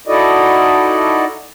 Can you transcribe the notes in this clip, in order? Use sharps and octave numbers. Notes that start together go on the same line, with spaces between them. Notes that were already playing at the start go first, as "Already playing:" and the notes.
D#4 E4 F#4 A4 D5 D#5